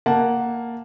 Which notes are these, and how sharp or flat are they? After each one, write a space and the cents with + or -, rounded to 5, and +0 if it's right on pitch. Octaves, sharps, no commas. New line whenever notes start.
A#3 +0 F#5 +0 A5 +0